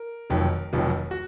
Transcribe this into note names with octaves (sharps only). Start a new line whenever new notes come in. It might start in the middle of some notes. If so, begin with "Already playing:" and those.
Already playing: A#4
F1 F2 D#3 F#3
F1 F2 D#3 F#3
F#4